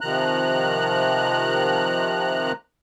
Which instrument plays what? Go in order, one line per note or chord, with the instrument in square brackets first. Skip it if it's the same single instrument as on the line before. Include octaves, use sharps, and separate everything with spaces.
[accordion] C3 D#3 F3 A#5 F#6